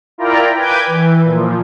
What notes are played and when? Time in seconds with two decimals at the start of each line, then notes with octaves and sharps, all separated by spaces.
0.18 E4 F4 A#4 D5 G5 A#5
0.55 B4 G5 G#5 D6 G6 G#6
0.87 E3
1.24 A#2 F3